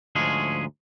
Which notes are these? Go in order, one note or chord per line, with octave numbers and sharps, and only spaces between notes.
D2 G#2 F3 G#3 C#4 G#4